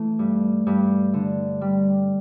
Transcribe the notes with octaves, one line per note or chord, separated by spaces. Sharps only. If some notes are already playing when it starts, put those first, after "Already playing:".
Already playing: E3 A3
G2
G2
D3
G3